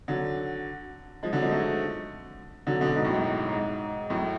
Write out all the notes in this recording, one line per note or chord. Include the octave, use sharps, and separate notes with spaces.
D3 F#3
F3 G#3
D3 F#3
F3 G#3
F#3 A3
D3 F#3
B2 D3
G#2 B2
F#2 A2
G#2
G#2
F#2 A2